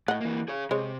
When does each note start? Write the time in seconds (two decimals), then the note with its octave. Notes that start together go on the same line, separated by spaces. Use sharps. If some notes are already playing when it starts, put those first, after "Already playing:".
0.08 A2 D#5 F#5
0.21 E3 A#3
0.48 G#4 C#5
0.71 C3 G#3 C#5